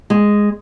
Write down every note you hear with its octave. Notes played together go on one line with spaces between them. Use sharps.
G#3